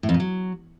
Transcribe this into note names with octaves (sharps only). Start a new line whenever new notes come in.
A2
F2
A#2
F#3